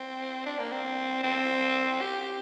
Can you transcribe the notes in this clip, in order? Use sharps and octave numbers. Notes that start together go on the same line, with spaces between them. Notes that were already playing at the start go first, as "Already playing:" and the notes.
Already playing: C4
D4
A#3
C4
C4
G4